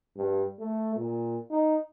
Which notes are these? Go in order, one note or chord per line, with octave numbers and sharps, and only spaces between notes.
G2
A3
A#2
D#4